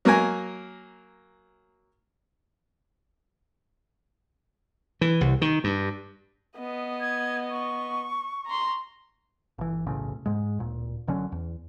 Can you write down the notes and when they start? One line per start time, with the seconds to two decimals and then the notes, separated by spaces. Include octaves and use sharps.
0.05 F#3 A#3 A#4 G#5
5.01 E3
5.21 C2
5.42 D#3
5.64 G2
6.59 B3 D#5
7.01 G#6
7.50 C#6
8.46 A#5 C6
9.58 G1 E3
9.86 E1 B1 A2 C#3
10.26 G#2 G#3
10.59 D1 A#2
11.07 F#1 D3 F#3 C#4
11.32 E2